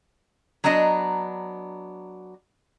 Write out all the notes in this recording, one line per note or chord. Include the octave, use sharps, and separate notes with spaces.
F#3 B3 D4 D#5 A#5